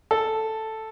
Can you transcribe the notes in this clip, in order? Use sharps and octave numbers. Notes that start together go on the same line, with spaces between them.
A4